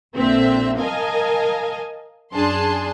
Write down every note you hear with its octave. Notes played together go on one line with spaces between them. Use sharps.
A#1 A#2 D3 C4 E5
A#4 D#5 F5 G#5 A5
F#2 D4 G#4 A5 C6